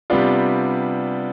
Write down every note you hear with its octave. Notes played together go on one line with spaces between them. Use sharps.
C3 G3 B3 D4 F4